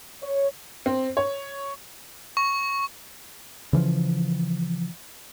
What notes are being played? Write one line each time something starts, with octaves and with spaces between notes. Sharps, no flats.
C#5
C4
C#5
C#6
C#3 E3 F3